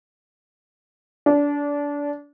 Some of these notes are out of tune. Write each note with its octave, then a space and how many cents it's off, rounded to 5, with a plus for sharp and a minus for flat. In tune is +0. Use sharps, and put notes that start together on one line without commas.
D4 -25